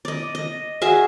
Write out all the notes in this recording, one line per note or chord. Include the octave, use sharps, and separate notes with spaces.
D5 D#5
D#5
F#4 G#4 E5 F5